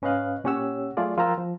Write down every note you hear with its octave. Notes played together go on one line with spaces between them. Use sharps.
G#2 C#4 B4 D#5 F5 F#6
A#2 C#4 G4 C#5 F#5 E6
F#3 A3 F4 G#4 D5
F3 F4 A#4 G5 A#5 E6
F3